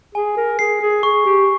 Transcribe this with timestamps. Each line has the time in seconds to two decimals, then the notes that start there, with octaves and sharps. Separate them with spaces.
0.15 G#4 G#5
0.37 A#4
0.59 G#4 C7
0.81 G#4
1.03 G#4 C#6
1.26 G4